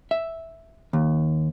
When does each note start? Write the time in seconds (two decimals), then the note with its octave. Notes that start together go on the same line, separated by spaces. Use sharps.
0.11 E5
0.93 D#2